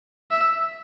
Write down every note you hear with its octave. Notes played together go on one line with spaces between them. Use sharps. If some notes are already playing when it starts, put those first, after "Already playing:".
E5